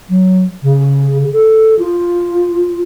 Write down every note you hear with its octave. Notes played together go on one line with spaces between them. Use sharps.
F#3
C#3
A4
F4